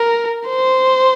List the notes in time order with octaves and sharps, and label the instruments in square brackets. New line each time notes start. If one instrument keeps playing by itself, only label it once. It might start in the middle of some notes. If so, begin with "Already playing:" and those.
Already playing: [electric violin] A#4
C5